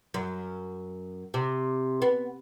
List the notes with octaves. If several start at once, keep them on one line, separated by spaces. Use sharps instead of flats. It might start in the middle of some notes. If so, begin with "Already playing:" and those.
F#2
C3
B3